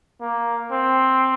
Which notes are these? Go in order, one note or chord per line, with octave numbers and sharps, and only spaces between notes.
A#3
C4